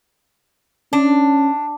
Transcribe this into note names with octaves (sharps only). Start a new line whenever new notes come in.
C#4 D4